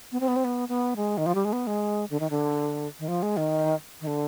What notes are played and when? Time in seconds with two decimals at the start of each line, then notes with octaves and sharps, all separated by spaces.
0.12 B3
0.20 C4
0.28 B3
0.36 C4
0.45 B3
0.69 B3
0.96 G#3
1.18 D#3
1.26 F3
1.35 G3
1.45 G#3
1.53 B3
1.67 G#3
2.10 D3
2.20 D#3
2.30 D3
2.99 D#3
3.08 F3
3.23 G#3
3.37 D#3
4.01 D#3
4.07 D3